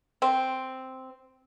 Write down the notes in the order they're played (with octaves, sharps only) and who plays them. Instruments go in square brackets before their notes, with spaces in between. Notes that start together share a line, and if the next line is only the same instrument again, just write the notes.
[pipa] C4